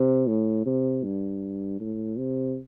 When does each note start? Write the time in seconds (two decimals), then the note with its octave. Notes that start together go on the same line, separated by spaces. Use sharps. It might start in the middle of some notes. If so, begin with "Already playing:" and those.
Already playing: C3
0.27 A2
0.66 C3
1.04 G2
1.80 A2
2.18 C3